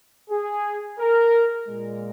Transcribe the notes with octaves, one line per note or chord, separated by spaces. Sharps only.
G#4
A#4
A#2 G#3